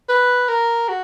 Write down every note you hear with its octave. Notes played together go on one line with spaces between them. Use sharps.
B4
A#4
F#4